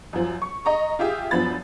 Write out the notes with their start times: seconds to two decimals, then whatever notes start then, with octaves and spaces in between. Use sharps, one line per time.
0.13 F#2 F3
0.42 C#6
0.65 D#5 A#5 C#6
0.99 F4 G4 G#4 E5 F5
1.31 F#2 F3 B3 D4 B5 A6